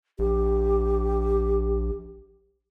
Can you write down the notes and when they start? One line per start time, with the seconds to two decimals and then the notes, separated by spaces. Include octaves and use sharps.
0.19 A#1 G4